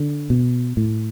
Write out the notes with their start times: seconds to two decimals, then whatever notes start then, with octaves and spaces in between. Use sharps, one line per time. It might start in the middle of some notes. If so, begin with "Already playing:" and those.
Already playing: D3
0.30 B2
0.77 A2